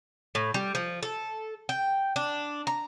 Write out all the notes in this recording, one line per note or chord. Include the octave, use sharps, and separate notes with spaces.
A2
G3
F3
A4
G5
D4
A#5